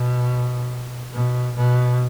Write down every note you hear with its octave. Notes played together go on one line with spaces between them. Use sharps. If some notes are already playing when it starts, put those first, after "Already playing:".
Already playing: B2
B2
B2